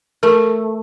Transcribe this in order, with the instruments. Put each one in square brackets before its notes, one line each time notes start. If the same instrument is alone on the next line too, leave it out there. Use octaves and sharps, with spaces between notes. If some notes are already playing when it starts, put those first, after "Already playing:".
[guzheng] A3 [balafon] A#4